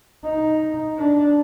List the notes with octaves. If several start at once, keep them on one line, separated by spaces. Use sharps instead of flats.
D#4
D4